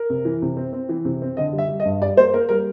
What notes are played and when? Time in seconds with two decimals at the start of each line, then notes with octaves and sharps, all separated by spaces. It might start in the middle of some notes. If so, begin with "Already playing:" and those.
Already playing: A#4
0.10 C3
0.25 E3
0.42 C3
0.57 C4
0.73 C4
0.89 E3
1.05 C3
1.22 C4
1.37 D3 D#5
1.53 G3
1.58 E5
1.69 G3
1.80 D#5
1.85 G2
2.02 G3 D5
2.17 A#3 C5
2.34 A#3 A#4
2.49 G3 A#4